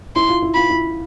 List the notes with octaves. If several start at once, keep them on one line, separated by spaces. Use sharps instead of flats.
E4 C6
F4
E4
F4 B5
E4